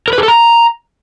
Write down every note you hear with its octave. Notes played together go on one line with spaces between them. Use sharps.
A#4
B4
G#4
A4
A#5